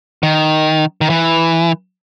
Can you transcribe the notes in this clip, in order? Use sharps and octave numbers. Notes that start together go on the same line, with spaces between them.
D#3
D#3
E3